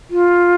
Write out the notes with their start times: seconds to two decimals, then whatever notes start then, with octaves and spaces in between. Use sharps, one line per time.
0.10 F4